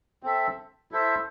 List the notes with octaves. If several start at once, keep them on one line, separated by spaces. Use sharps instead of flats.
C4 A4 E5
E4 A4 C5 E5